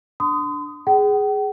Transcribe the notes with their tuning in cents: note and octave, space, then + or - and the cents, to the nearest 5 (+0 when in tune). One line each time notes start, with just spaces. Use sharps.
D4 +0 C6 -40 D#6 +0
G#4 +0 G5 -45